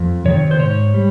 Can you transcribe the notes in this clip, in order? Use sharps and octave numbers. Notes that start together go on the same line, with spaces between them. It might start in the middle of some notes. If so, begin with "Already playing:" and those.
Already playing: F2
C3 D#3 C#5
C5
G#2 C#5
G3